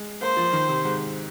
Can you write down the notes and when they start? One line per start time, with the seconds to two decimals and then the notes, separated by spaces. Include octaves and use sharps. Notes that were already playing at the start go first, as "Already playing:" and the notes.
Already playing: G#3
0.21 A#3 C5
0.37 F3
0.53 D#3
0.69 C3
0.85 G#2